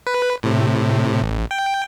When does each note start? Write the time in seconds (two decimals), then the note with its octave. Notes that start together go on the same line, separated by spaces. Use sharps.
0.07 B4
0.43 A2 C3
1.23 A1
1.51 G5